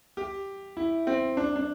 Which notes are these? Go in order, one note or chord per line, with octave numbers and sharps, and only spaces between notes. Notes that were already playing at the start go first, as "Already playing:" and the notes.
G4
E4
C4
D4
D4